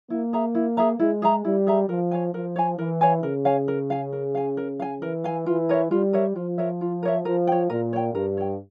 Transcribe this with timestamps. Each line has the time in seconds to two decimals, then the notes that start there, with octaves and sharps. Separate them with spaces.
0.10 A#3 E4
0.33 G#4 E5 A#5
0.55 E4
0.77 G#4 E5 A#5
0.99 G#3 E4
1.22 G#4 E5 A#5
1.45 G3 E4
1.67 G#4 E5 A#5
1.89 F3 A#4
2.11 C#5 F5 G#5
2.34 F3 A#4
2.56 C#5 F5 G#5
2.78 E3 A#4
3.01 C#5 F5 G#5
3.23 C#3 A#4
3.45 C#5 F5 G#5
3.68 A#4
3.90 F5 G#5
4.12 A#4
4.35 F5 G#5
4.57 A#4
4.80 F5 G#5
5.01 E3 A#4
5.24 F5 G#5
5.46 E3 F4
5.69 A#4 C#5 E5
5.91 G3 F4
6.13 A#4 C#5 E5
6.36 F3 F4
6.58 A#4 C#5 E5
6.81 F4
7.03 A#4 C#5 E5
7.25 F3 A#4
7.47 C#5 G5
7.70 A#2 A#4
7.93 C#5 G5
8.14 G2 A#4
8.37 C#5 G5